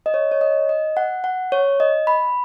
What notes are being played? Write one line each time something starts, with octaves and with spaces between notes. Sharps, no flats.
D#5
C#5
C#5
D#5
D#5
F#5
F#5
C#5
D#5
B5